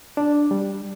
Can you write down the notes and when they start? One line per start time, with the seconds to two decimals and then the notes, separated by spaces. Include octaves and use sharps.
0.17 D4
0.51 G3